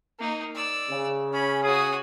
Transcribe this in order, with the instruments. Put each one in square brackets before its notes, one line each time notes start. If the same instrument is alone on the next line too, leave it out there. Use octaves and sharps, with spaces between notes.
[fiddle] A#3 D#4
D5 E6
[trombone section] C#3
[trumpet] C#4 [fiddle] B5
[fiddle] F#4 D#6 [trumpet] G#4